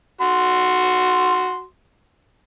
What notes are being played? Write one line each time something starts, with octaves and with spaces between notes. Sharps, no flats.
F#4 C6